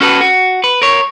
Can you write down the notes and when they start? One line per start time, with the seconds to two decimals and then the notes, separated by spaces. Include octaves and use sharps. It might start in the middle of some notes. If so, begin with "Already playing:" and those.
0.01 C#4 F#4 A4 B4
0.21 F#4
0.64 B4
0.82 A#4 C#5